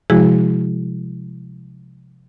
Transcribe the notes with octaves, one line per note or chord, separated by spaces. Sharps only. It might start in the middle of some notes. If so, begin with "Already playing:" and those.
C3 F3 G#3 E4 F#4 G#4